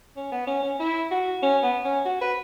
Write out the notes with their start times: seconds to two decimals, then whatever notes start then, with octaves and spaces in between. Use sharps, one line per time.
0.16 C#4
0.32 B3
0.47 C#4
0.63 C#4
0.80 E4
1.11 F#4
1.43 C#4
1.63 B3
1.84 C#4
2.05 F#4
2.21 B4